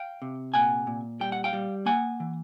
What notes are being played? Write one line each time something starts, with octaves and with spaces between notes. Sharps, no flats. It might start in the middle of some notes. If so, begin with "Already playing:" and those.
Already playing: F5 G5
C3
A#2 F#5 G#5
A#2
G3 G5
F#5
F5 G5
G3
A#3 F#5 G#5
E3